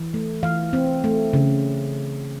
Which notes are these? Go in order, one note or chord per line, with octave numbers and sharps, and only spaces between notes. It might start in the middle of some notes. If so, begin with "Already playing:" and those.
Already playing: E3
A3
E3 F5
C4
A3
C#3